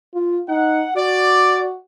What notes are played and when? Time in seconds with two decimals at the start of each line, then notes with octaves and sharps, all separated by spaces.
0.14 F4
0.49 D#4 F#5
0.97 F#4 D5